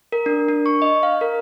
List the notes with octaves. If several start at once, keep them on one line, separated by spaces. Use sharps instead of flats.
A#4
D4
D4
C#6
D#5
F5
A#4